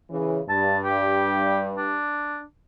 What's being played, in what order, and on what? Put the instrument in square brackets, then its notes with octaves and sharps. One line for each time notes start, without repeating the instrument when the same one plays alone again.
[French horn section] C#3 E3
[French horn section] G2 [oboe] A5
[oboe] G4
D4